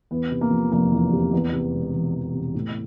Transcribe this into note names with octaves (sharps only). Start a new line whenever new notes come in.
E2 B3
C3
A#3
F3
F1 A#3
E2
C3
E2 B3
C3
E1
E1
E2
C3
A2